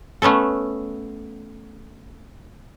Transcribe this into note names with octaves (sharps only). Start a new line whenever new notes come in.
A3 B3 C#4 A4